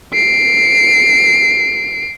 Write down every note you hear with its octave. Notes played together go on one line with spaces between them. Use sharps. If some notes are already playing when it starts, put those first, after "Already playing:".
C7 D7